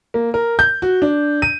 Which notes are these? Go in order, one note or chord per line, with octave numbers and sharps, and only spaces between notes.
A#3
A#4
G6
F#4
D4
D#7